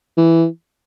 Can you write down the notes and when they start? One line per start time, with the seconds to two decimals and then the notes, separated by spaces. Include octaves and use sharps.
0.17 E3